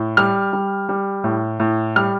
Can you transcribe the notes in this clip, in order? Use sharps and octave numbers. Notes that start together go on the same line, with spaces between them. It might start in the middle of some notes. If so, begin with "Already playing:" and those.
Already playing: A2
G3 F6
G3
G3
A2
A2
G3 F6